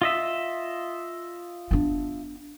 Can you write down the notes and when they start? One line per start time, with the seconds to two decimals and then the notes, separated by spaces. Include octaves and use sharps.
0.02 F4 D#5 E5
1.71 B3 D4